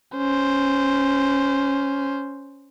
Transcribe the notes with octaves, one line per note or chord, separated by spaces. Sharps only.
C#4 C5